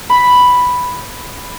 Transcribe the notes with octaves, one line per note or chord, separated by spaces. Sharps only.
B5